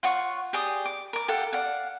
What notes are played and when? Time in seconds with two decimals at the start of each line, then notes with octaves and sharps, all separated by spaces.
0.03 F4 C#5 F#5 C#6
0.53 G4 G#4 D5 D#6
0.86 D6
1.13 A#4 D6
1.28 G4 A4 F5 F#5
1.53 D5 F5 F#5